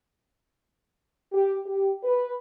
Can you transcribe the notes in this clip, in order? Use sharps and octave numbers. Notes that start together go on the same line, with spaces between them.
G4
G4
B4